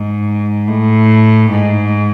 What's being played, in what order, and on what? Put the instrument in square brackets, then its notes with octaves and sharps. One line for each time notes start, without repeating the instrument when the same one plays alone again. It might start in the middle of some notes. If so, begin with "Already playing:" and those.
Already playing: [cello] G#2
A2
G#2